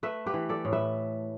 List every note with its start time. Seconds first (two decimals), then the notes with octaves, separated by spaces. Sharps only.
0.03 A3 B4 E5
0.26 G4 B4
0.34 E3
0.49 A4 D5
0.65 A2
0.73 B4 E5